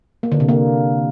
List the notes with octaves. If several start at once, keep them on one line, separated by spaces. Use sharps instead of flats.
A#3
D3
C3
A#3